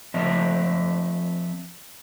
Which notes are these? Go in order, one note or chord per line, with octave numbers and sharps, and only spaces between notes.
F3 C4 D#5 E5